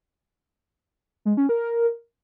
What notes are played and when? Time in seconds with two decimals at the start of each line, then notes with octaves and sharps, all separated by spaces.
1.25 G#3
1.37 C#4
1.49 A#4